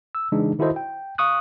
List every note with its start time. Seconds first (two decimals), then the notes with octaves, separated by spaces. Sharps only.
0.15 E6
0.32 C#3 E3 G#3 D4 D#4
0.59 D#3 E4 F#4 A4 C5 D#5
0.76 G5
1.18 F5 C#6 D#6 F#6